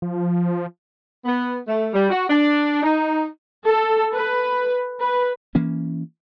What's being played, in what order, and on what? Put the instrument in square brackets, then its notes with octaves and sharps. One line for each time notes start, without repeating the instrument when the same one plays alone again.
[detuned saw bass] F3
[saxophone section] B3
A3
G3
F#4
D4
D#4
[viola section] A4
B4
B4
[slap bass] E3 A#3 C#4